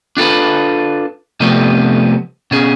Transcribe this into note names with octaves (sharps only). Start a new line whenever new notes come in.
D4 F4 A4 B4
C3 F3 G3 A3 B3
B2 C#4 G#4